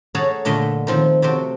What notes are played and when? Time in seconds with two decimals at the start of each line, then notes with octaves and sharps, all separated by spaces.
0.15 G#4 A4 C#5 F#5 A5 A#5
0.45 A#2 D3 A3 D#5 E5
0.87 D#3 F3 C4
1.22 C3 A3 C4 F#4